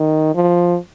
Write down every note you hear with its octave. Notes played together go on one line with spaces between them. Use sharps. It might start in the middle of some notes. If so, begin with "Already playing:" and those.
Already playing: D#3
F3